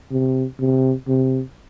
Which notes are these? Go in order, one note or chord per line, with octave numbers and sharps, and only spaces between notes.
C3
C3
C3